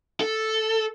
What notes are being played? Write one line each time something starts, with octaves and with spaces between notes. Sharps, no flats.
A4